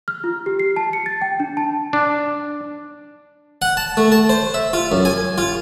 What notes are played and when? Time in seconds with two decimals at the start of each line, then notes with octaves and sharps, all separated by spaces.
0.08 F6
0.24 F4
0.46 G4
0.60 C7
0.76 A5
0.93 C#7
1.06 A6
1.22 G5
1.40 D4
1.57 A5
1.93 D4
3.62 F#5
3.77 A5
3.97 A3
4.12 A5
4.29 C5
4.54 E5
4.73 F4
4.92 F#2
5.05 G#5
5.38 F4